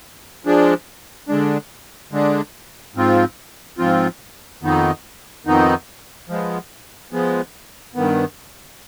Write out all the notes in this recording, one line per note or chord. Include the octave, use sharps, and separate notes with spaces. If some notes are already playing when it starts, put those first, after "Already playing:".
F3 G#3 D4
D3 G#3 D4
D3 G#3 D4
G#2 F3 C4 F4
G#2 F3 C4 F4
F2 D#3 B3 D#4
F2 D#3 B3 D#4
F3 G#3 B3
F3 G#3 B3
G2 D#3 B3